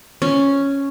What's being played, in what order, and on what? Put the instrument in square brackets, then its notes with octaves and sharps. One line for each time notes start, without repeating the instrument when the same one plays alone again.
[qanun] C#4